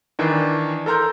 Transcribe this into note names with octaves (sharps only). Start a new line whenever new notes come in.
D#3 E3 D4
A4 A#4 A#5 C6 G6